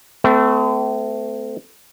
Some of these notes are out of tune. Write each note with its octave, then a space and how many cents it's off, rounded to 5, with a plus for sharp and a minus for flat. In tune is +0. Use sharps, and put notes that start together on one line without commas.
A3 +0 C4 -40